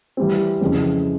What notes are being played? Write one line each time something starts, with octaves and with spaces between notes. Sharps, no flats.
E3 G3 C4
F2 C#3 E3 G#3 C4